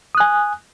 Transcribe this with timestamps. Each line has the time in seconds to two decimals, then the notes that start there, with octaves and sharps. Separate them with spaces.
0.15 D#6
0.17 F#6
0.20 G#5